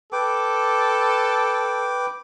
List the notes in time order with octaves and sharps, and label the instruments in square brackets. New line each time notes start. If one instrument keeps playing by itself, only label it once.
[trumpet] A4 [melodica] B4 G5 D6